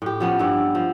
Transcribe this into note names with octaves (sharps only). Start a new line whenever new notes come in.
A2 G4
F3 B3 C#4
G2 B3 E4
F3